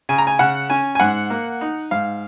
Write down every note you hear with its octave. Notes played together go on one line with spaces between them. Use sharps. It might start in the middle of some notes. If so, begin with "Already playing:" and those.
C#3 G#5
A#5
G#5
C#3 F#5
C#4 G#5
G#5
G#2 F#5
A#3
D#4
G#2 F5